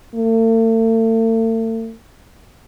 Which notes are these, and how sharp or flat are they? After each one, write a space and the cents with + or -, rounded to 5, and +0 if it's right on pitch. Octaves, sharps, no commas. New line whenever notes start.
A3 +40